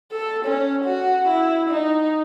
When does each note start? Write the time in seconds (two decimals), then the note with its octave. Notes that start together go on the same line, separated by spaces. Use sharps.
0.12 A4
0.45 C#4
0.85 F#4
1.28 E4
1.69 D#4